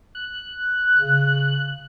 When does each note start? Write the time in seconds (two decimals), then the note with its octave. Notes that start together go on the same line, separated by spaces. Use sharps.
0.15 F#6
0.97 C#3